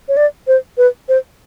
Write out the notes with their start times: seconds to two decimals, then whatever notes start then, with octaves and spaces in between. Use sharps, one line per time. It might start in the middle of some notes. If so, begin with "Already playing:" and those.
0.08 C#5
0.17 D5
0.47 C5
0.78 B4
1.09 C5